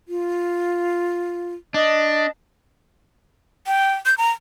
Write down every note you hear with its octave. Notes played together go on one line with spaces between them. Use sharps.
F4
D4 D#5
G5
G6
A#5